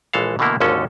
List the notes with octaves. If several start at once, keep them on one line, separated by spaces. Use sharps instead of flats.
A#1 E3 G#3 A4 F5
B2 D3 E3 A3 A#3 E4
G#1 D#2 D3 G#3 C#4 A4